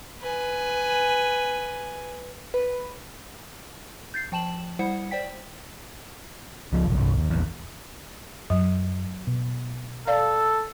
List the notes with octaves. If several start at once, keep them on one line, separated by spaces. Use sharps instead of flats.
B4 G#5
B4
G6 A6 C7
F3 G5 A5 E7 F#7
G3 E4 C5 F#5 C#7
C5 D5 G5 B6
C#2 F3
F1 A#1
G1 C2
D#2
A#1 E2
F#2 F#3
B2
A4 D5 F5